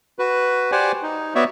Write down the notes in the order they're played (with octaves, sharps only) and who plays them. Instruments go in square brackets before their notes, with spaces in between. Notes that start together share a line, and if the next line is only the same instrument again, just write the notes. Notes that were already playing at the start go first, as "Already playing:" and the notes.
[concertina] F#4 B4
G4 C5 D5 F#5 G#5
D#4
B3 F#4 C#5 D5 E5